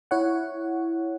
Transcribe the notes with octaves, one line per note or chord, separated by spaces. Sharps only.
E4 C#5 F#5